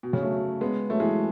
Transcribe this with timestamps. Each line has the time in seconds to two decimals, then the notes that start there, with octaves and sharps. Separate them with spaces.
0.03 B2
0.13 C#3
0.22 F#3 A3
0.61 G#3 B3
0.90 F#3 A3
1.00 E3 G#3